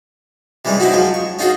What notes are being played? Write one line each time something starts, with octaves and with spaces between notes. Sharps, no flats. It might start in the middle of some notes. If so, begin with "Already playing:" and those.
C3 E3 G3 G#3 C#4
C4 C#4 D#4 E4 F#4
F3 F#3 G#3
C#6
C#4 D#4 F4 F#4 G#4